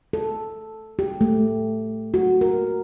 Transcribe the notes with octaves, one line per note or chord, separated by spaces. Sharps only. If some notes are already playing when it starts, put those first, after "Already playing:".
A4
G4
A3
F#4
A#4